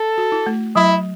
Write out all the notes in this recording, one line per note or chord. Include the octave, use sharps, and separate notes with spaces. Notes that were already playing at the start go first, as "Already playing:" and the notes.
Already playing: A4
F#4
E4
A3
F#3 E4